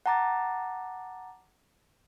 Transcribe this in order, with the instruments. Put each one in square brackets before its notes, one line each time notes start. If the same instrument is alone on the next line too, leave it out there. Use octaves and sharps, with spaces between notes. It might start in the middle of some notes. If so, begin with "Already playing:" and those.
[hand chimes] F#5 A5 A#5 D6 A6